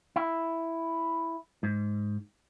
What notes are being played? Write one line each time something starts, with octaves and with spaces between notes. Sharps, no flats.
E4
G#2